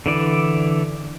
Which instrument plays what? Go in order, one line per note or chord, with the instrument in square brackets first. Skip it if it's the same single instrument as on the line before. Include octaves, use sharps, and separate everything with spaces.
[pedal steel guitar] D3 E3 D5